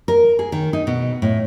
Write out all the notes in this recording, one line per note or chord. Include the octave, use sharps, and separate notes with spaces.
A#4
G#4
D#3
D#4
B2
A2